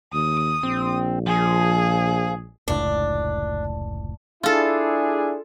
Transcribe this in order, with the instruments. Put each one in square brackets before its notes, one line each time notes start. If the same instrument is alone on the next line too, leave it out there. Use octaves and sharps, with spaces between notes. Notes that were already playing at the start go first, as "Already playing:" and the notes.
[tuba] D#2 [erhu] D#6
[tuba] A#1 [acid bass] C4
[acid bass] F3 [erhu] G#4
[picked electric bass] F1 C#2 A2 [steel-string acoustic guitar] D4
[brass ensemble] D4 E4 G#4 [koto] F4 A4